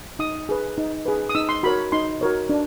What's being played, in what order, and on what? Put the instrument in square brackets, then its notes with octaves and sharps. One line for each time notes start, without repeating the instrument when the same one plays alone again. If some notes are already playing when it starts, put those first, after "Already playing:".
[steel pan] D#4 D#6
G#4 B4
D#4
G#4 B4
D#6
D#4 E6
C6
F#4 A#4 C#5 B5
D#4 C6
F#4 A#4 C#5
D4